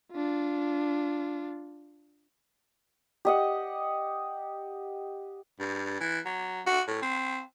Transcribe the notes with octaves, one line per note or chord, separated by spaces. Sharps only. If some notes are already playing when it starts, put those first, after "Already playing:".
D4 F4
G4 D#5 F#5
G2
E3
F#3
F#4
A2
C4